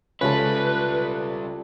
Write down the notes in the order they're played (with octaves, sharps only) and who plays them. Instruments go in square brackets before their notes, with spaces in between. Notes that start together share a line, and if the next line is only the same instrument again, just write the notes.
[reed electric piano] C#2 C#4 [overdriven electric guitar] G3 E4 [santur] F4 A4 [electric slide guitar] B4